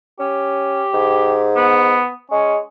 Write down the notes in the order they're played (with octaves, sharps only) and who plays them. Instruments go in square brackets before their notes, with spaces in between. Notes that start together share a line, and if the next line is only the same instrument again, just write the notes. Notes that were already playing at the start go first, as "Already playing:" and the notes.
[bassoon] C#4 [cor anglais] G4
[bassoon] G#2
[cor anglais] B3
[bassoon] G#3 [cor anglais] C#4